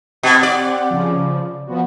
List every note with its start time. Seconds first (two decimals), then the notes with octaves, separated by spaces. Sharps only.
0.23 B2 C4 G4 F#5
0.43 D5
0.91 C#3 F3
1.67 F3 B3 F#4